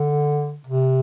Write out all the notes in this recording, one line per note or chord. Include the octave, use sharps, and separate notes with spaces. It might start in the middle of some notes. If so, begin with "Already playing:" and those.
Already playing: D3
C3